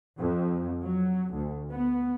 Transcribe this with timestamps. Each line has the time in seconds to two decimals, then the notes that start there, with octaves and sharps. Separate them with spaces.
0.18 F2
0.83 F#3
1.34 D2
1.72 B3